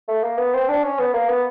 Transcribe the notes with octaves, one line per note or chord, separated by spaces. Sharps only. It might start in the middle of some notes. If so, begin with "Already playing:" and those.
A3
A#3
B3
C4
D4
C#4
B3
A#3
B3